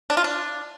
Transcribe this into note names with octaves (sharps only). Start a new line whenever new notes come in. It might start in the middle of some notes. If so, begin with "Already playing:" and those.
D4
F4
D4